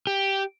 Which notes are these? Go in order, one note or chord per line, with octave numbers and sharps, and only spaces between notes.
G4